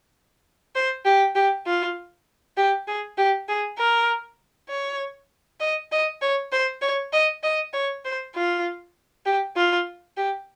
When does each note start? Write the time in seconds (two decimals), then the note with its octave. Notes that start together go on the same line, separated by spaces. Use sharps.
0.75 C5
1.05 G4
1.35 G4
1.66 F4
2.57 G4
2.87 G#4
3.17 G4
3.48 G#4
3.78 A#4
4.69 C#5
5.60 D#5
5.92 D#5
6.22 C#5
6.52 C5
6.82 C#5
7.12 D#5
7.43 D#5
7.73 C#5
8.04 C5
8.34 F4
9.25 G4
9.56 F4
10.17 G4